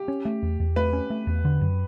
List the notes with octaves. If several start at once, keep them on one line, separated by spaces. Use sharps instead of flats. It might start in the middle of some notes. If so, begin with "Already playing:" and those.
Already playing: G4
C#4
A3
E2
E2
A3 B4
C#4
A3
E2
D3
F#2